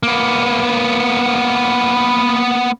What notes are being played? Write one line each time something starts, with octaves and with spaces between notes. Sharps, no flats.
A#3 B3